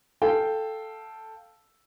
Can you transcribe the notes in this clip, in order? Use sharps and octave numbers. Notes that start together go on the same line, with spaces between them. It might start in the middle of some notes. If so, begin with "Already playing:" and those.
A4 F5 G5